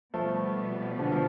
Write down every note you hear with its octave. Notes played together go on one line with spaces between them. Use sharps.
B2 F3 G3 A3 B3
D3 F3
F3